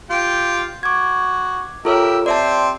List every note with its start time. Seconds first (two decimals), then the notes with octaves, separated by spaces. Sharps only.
0.10 F4 G4 G5
0.83 F#4 D6 G#6
1.85 F4 G4 A4 A#4 C#5 E5
2.26 C4 G4 C5 D5 E5 A5